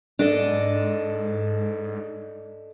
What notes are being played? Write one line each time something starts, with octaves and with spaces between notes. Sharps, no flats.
G#2 D4 A4 D#5